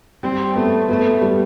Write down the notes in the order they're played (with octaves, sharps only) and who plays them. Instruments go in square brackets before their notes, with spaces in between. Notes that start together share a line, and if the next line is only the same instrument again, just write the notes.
[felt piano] G3 [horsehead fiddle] C4
[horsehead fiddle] A3 [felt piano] B3
[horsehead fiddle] A3 [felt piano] B3
[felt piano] G3